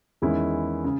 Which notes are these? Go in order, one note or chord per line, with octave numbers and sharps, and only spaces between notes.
E2 D#3 G#3 C#4 E4
C#3